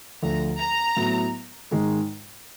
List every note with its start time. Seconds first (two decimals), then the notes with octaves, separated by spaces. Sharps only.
0.22 D2 D3 F3 A#5
0.60 A#5
0.96 A2 F#3 B3 E4
1.71 G#2 D#3 G#3